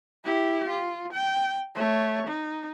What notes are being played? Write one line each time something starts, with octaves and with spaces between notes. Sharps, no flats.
E4 G4
F4
G5
A3 C#5
D#4